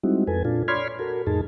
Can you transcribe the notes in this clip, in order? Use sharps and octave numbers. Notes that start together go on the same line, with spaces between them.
G3 G#3 C4 D#4 E4 F#4
F2 A4 B4 G#5
A#2 D4 F4 A4
C#5 D5 B5 C6 F6 G#6
F#4 A4 A#4
F2 A2 D#4 G#4 A5